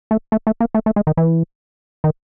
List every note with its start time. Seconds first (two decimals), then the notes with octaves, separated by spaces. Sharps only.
0.11 A3
0.32 A3
0.47 A3
0.61 A#3
0.75 A3
0.86 A3
0.96 G#3
1.07 D#3
1.17 E3
2.04 D#3